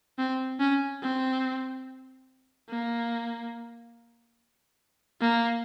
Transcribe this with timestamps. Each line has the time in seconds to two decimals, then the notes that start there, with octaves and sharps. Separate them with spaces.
0.18 C4
0.59 C#4
1.02 C4
2.69 A#3
5.21 A#3